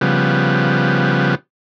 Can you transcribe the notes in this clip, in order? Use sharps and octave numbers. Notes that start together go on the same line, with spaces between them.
C#3 F3 G3 B3